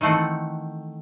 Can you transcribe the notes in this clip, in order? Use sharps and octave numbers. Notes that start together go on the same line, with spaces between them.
D#3 E3 A3 C4 F#5